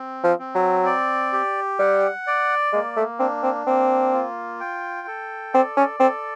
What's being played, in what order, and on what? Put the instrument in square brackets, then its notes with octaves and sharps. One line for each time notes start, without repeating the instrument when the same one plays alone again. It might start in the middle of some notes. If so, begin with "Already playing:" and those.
Already playing: [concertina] C4
[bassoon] F3
[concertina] C4
[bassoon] F#3
[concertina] D5
G4
[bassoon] G3 [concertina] F#5
[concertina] D5
[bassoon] G#3 [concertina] A#3
[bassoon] A3
[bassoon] C4 [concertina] D4
[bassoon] C4
[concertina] A#3 [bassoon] C4
[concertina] F4
G5
A4
[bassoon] C4 [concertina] D5
[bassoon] C#4
[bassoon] C4 [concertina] A4